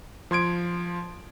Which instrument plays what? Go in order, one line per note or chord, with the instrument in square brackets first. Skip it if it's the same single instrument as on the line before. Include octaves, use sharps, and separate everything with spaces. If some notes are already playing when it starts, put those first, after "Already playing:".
[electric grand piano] F3 C6 G#6 D7